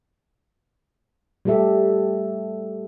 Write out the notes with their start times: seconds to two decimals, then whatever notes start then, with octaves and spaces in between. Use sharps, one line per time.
1.45 G3 A3 G4 A4 E5